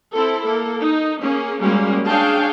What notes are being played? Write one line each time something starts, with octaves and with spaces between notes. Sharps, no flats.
C4 E4 A4
A#3 A4
D#4
A#3 C#4 G#4
G3 G#3 A#3 C#4 F#4
D4 G#4 C#5 F5 G5 A5